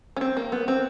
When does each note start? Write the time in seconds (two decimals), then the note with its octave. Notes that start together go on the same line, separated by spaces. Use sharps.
0.16 C#4
0.21 C4
0.37 A#3
0.52 B3
0.68 C4